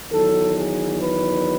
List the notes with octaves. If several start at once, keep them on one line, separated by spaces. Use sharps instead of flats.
E2 D#3 F#3 A4
G#4
B4